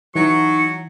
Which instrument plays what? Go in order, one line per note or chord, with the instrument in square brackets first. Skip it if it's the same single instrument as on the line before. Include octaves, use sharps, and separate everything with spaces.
[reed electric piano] E3 [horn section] F#3 [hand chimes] D#4 [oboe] C#6